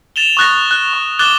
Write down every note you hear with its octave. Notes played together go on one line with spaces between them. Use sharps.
A6 E7 F7 G7
C#6 D#6 F#6 A6 A#6
F#6
C#6
D6 F#6 A6 E7 G7